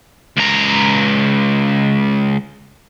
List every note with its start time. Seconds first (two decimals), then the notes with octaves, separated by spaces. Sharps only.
0.37 C#2 A#5